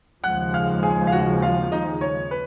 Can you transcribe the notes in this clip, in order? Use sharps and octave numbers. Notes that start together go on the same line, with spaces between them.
D#2 C#3 F3 G#3 F#5 F#6
F5 F6
G#4 G#5
F5
F#4 F#5
F4 F5
D#4 D#5
C#5
B4